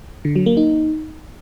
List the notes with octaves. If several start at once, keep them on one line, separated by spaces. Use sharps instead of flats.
D3
F#3
A#3
D#4